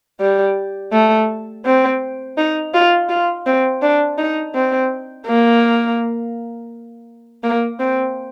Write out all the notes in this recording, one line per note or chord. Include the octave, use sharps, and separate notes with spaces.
G3
A3
C4
D#4
F4
F4
C4
D4
D#4
C4
A#3
A#3
C4